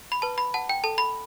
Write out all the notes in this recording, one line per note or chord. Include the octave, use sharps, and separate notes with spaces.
B5
B4 A5
B5
F#5 A5
G5
A4 A5
B5